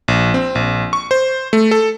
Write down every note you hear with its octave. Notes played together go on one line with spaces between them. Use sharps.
A#1
C4
A#1
C#6
C5
A3
A4